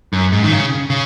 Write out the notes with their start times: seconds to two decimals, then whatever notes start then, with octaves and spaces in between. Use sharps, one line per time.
0.13 F#2
0.32 G#2
0.43 D#3
0.52 C#3
0.90 C#3